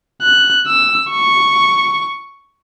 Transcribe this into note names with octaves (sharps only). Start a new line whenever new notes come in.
F#6
E6
C#6